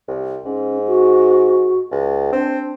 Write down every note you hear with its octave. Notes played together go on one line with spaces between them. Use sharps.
C2
G#2 C#4
F#4
C#2
C4 D4